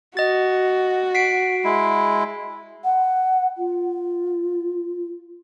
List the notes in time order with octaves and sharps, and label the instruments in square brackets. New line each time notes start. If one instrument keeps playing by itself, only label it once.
[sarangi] F#4 [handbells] D#5 A6
[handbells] B6 C7 D7
[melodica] G#3 E4
[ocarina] F#5
F4